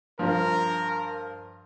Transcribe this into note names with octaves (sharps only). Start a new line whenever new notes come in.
G2 F3 A#4